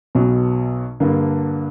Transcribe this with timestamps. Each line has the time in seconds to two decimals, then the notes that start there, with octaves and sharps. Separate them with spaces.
0.15 B1 B2 F#3
1.00 G2 D3 A#3